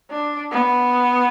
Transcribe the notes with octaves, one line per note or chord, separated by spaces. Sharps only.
D4
B3